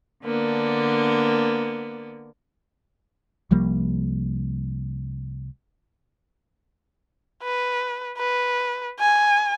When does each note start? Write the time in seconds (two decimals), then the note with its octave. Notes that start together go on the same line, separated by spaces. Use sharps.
0.23 D3 A#3 B3 D4
3.51 C2 F3 G3 A#3
7.43 B4
8.18 B4
9.00 G#5